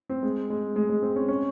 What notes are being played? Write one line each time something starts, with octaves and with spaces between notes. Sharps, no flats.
C4
G#3
G#3
G#3
G#3
C4
C#4
C#4